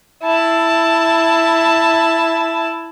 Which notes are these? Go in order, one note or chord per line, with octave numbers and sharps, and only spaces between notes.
E4 A5